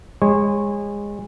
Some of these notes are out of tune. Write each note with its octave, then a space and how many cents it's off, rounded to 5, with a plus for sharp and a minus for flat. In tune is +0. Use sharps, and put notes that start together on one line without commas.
G#3 -25 C#5 -25